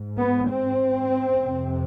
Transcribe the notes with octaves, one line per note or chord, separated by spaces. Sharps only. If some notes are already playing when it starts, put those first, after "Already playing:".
Already playing: G#2
B3
C4
F2 C3